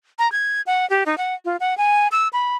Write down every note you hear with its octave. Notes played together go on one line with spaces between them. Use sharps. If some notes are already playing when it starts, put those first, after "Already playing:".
A#5
G#6
F#5
G4
D#4
F#5
F4
F#5
G#5
E6
B5